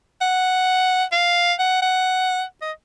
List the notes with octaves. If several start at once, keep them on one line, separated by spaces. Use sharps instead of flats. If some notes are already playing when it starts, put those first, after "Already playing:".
F#5
F5
F#5
F#5
D#5